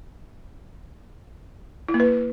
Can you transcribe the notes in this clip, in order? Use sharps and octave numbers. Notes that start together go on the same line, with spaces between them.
E4
A#3
B4